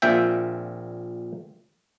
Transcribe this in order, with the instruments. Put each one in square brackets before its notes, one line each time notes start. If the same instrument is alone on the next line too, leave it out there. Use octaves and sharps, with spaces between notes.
[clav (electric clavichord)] A#1 A#2 C4 E5 G5